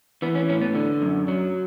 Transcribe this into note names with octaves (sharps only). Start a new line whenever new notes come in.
E3 B3
C#4
A2 C#4
B3
D3
F#2
F#3